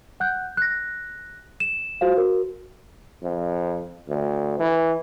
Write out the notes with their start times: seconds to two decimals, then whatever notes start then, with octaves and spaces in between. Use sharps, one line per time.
0.20 F#5 F#6 G6
0.57 F#6 A#6
1.60 E7
2.01 F4 F#4 C5 F5
2.17 F#4 A#4
3.23 F2
4.08 D2
4.59 E3